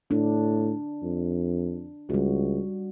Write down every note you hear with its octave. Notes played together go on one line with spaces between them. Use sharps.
A2 D4
F2
C#2 G3 F#4